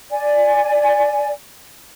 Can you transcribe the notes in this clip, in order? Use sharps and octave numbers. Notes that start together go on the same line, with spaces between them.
D5 G#5